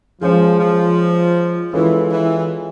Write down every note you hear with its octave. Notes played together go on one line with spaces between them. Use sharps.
F3 G#3 C#4 F4 G#4
F3
E3 G#3 C#4 F4 A4
E3